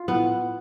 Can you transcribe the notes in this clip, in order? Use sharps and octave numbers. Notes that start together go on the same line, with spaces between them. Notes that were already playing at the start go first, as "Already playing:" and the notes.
Already playing: F4
A2 B3